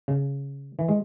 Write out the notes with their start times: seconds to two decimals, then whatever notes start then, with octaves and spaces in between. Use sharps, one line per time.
0.08 C#3
0.79 E3
0.89 G#3